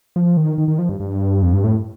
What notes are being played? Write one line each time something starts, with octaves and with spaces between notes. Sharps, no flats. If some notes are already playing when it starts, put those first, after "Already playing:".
F3
D#3
D#3
D#3
F3
G2
G2
F2
G2
A2